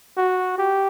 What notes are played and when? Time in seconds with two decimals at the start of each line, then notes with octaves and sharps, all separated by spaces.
0.17 F#4
0.58 G4